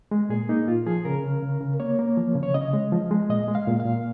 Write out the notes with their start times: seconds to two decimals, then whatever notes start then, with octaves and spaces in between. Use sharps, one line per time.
0.11 G#3
0.29 A#2 G#4
0.49 A#3 D#4
0.67 A#2 F4
0.86 F3 G#4
1.05 C#3 A#4
1.24 C#3
1.42 C#3
1.61 C#3
1.80 A#3 C#5
1.99 A#3
2.17 F3
2.35 C#3
2.43 C#5
2.54 C#3 D#5
2.73 G#3
2.92 F3
3.11 G#3
3.29 A#2 D#5
3.48 G#3
3.55 F5
3.67 A#2
3.80 F5
3.86 A#2